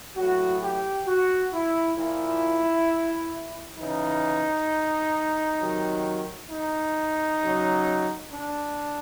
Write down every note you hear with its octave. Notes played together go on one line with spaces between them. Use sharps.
A2 F#3 F#4
G4
F#4
E4
A#2 F3 E4
C#3 E3 D#4
C3 D#3 F#3
D#4
C#3 F#3
D4